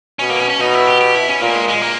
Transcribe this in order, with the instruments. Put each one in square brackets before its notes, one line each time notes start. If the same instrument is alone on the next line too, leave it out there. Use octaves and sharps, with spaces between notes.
[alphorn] B2 [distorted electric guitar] C#4
[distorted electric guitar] A#3
C#4
C#4
[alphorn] B2 [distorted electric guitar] D#4
[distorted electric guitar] E4
G4
G4
E4
C#4
[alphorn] A#2 [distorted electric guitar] A#3
[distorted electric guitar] G#3
G#3
A#3